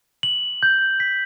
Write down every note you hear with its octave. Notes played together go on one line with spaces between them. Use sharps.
F#7
G6
B6